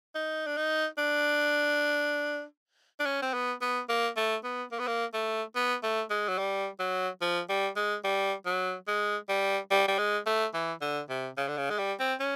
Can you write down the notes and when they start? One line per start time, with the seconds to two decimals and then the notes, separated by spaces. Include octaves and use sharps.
0.15 D#4
0.46 D4
0.57 D#4
0.98 D4
3.00 D4
3.06 C#4
3.22 C4
3.34 B3
3.62 B3
3.89 A#3
4.17 A3
4.44 B3
4.72 A#3
4.79 B3
4.87 A#3
5.14 A3
5.55 B3
5.83 A3
6.10 G#3
6.29 F#3
6.38 G3
6.80 F#3
7.21 F3
7.49 G3
7.76 G#3
8.04 G3
8.46 F#3
8.88 G#3
9.29 G3
9.71 G3
9.88 G3
9.98 G#3
10.26 A3
10.54 E3
10.81 D3
11.09 C3
11.37 C#3
11.48 D3
11.58 C#3
11.70 G#3
11.79 G3
12.00 C4
12.20 C#4